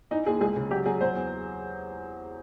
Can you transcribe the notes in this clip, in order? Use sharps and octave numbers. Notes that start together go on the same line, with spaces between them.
E3 D#4
D#2 G#4
C#2 G#4
C#3
F#3 G4
F#3 G#4
F#3 C5
E2